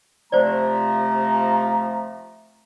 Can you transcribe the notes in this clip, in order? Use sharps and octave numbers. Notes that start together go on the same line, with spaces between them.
C3 F3 A3 C5 D5 A#5